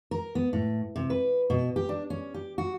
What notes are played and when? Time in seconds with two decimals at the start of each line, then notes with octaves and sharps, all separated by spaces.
0.11 A#4
0.35 B3
0.53 A2
0.96 C3
1.10 B4
1.50 B2
1.76 G4
1.89 D4
2.10 C#4
2.34 G4
2.58 F#4